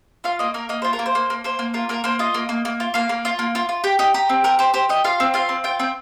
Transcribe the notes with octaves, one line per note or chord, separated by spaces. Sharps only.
F4 F5
A#3 D#5
A#3 A#4
A#3 D#5
F4 C5
A#4
A#3
C5
A#3
A#3
A#3 C5
A#3
F4 A#4
A#3 A#4
A#3 C5
F4 D#5
A#3
A#3
A#3
F4
A#3 F5
A#3
F4
A#3
F4
F4
G4 G5
G4 D#5
G4 A#5
C4
G4 A#4
G4 C5
G4 C5
G4 D#5
F4 F5
C4
F4 F5
C4
F4 G5
C4 G5